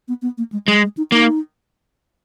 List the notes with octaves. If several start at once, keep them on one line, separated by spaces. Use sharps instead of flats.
B3
B3
A#3
G#3
G3 G#3
G#3
D#4
A#3 D#4